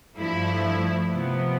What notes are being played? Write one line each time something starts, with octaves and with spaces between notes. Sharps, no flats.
G2 F3 A3 E4
C3 F3 B3